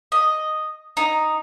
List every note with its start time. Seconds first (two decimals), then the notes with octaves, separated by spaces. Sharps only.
0.12 D#5
0.97 D#4